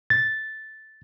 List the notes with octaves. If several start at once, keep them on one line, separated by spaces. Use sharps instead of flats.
A6